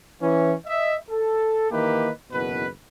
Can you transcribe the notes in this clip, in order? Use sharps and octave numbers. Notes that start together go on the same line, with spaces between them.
E3 C#4
D#5 E5
A4
D#3 E3 A#3 D#4 G4 B4
F#1 E2 B2 D#3 B4